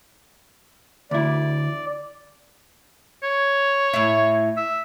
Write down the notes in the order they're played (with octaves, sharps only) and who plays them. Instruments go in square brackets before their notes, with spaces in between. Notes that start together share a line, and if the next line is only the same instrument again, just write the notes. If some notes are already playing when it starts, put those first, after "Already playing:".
[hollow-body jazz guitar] D2 E4 [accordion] D5
[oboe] C#5
[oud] A2 E4
[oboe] E5